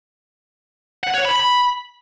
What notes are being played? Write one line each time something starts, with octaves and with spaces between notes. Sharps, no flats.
F#5
C#5
B5
B5